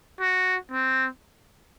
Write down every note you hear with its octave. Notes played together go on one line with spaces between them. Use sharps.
F#4
C4